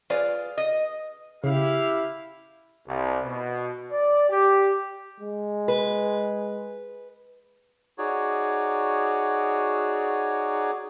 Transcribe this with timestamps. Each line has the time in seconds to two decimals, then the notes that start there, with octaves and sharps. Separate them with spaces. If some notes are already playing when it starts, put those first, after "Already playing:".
0.10 F4 G#4 B4 D5
0.58 D#5
1.44 C#3 E4 G4 F5
2.87 C2
3.23 B2
3.92 D5
4.30 G4
5.20 G#3
5.68 B4
7.98 D#4 F#4 G#4 C#5 D5